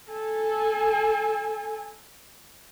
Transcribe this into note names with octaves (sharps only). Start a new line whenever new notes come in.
A4 G#5